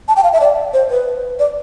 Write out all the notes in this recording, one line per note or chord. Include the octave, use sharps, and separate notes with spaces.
A5
G5
F5
E5
D5
C5
B4
D5